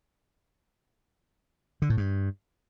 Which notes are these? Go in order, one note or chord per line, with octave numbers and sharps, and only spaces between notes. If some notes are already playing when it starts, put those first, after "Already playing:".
D3
A2
G2